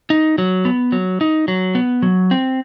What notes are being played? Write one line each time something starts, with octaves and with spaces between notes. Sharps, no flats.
D#4
F#3
B3
F#3
D#4
F#3
B3
F#3
C4